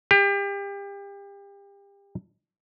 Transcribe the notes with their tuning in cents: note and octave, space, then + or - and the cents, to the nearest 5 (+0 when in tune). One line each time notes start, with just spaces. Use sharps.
G4 +30